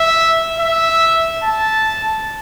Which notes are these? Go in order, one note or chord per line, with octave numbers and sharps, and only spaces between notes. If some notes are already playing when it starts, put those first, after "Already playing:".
Already playing: E5
E5
A5